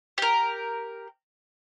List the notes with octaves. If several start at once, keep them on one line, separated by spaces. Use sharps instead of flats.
G4 A#4